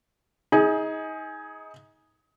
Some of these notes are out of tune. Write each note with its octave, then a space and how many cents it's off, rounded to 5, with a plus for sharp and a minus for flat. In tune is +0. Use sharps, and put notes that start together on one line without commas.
D#4 +30 G#4 +0